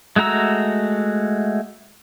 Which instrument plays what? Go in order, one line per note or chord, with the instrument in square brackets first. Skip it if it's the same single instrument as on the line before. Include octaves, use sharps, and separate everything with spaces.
[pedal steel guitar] G#3 A3 F#4 A#5 E6